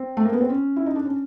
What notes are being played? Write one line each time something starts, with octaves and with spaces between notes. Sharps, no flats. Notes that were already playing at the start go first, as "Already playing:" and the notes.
Already playing: C4
A3
A#3
B3
C4
C#4
E4
D#4
D4
C#4